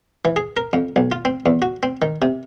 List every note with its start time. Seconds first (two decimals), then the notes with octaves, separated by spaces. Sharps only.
0.25 E3
0.36 G#4
0.57 A#4
0.73 F2
0.96 B1
1.12 F4
1.25 C4
1.46 E2
1.62 F#4
1.83 C4
2.02 D#3
2.22 C3